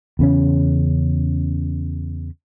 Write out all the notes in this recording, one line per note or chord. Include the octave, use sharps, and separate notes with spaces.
E2 C#3 C#4